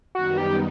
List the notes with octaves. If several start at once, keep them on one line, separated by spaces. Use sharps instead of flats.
F#2 D#3 G3 B3 D#4 F#4
G4